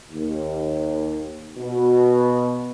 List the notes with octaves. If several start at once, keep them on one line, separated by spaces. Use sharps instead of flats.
D#2
B2